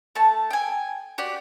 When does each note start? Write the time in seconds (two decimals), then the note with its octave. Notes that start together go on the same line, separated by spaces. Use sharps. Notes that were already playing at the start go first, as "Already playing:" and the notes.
0.15 A3 A5
0.51 G5 G#5
1.18 F#4 G4 D5